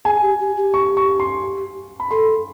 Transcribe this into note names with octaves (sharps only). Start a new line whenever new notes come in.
G#4 G#5
G4
G4
G4
C#6
C#6
C6
B5
A4 C6